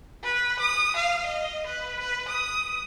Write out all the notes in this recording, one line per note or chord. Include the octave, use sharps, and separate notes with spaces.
B4
D#6
F5
D#5
B4
B4
D#6